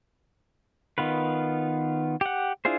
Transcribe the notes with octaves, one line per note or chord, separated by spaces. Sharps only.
D#3 B3 F4 B4
G4 F#5
D4 E4 F4 G#4 C5